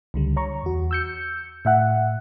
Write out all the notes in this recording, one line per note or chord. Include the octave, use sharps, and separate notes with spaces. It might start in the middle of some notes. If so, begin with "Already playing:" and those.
C#2 D3 G3
C#5 A#5 C#6
E2 F#4
E6 G6 C#7
A2 E5 F#5